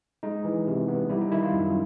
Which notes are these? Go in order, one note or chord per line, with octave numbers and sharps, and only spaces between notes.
G#3 D#4
E3
C3
B3
G3 E4
D#4
D#3 E4
F4
F#2